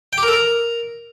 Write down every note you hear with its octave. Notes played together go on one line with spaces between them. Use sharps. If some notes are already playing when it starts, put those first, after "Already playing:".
G5
G4
A#4
A4
A#4